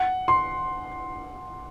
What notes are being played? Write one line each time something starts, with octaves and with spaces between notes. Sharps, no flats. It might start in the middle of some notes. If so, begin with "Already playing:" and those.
Already playing: F#5
C6